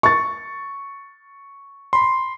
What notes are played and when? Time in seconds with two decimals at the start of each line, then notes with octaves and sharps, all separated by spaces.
0.03 C#6 A6
1.93 B5 C6